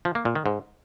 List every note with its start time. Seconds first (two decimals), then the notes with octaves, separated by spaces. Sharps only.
0.05 F3
0.15 A#3
0.25 A#2
0.35 D#3
0.46 G#2